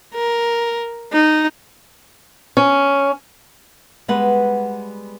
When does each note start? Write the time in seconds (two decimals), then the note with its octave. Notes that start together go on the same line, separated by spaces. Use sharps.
0.14 A#4
1.13 D#4
2.57 C#4
4.08 G3 G#3 B3 B4 F#5